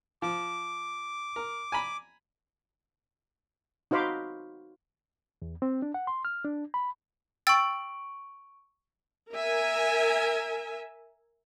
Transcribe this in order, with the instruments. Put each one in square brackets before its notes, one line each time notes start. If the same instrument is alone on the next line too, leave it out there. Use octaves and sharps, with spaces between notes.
[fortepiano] F3 [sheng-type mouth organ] D6
[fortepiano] A#4
G#5 A#5 B5
[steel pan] D#4 F#4 C5 F5 B5 D6
[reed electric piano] E2
C4
D4
F#5
C6
F6
D4
B5
[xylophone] G5 E6 A6 [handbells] C#6 D7
[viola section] A#4 E5 G#5